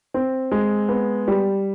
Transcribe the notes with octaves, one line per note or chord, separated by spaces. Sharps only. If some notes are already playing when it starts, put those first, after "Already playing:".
C4
G#3
B3
G3